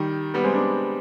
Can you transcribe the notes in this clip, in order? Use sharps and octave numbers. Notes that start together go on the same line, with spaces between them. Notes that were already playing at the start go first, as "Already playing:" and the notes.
Already playing: D#3 G3
G3 B3
G#3 C4
B3 D4